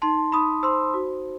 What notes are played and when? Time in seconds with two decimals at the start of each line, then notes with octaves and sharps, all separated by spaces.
0.02 D#4 A5 C6
0.32 D#4 B5 D#6
0.63 C5 C6 E6
0.94 F#4